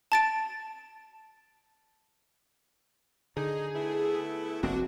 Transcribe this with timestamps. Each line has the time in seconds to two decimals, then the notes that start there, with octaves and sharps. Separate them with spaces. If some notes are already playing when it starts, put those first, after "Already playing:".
0.12 A5 A6 D7
3.37 D3 D#4 G#4
3.75 A3 B3 E4
4.63 F1 A#3 C4 D4 F#4